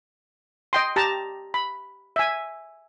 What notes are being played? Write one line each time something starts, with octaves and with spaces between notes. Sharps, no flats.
D#5 G5 C6
G4 A5 A#5
B5
E5 G#5